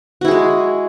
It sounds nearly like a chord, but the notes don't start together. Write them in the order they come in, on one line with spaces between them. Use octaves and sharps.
F#4 E4 G#4 G#3